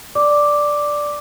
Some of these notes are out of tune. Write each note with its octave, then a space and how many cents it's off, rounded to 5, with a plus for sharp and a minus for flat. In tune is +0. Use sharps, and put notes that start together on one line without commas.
D5 +0 D6 +0